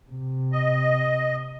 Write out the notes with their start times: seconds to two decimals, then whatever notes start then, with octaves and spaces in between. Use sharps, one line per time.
0.10 C3
0.52 D#5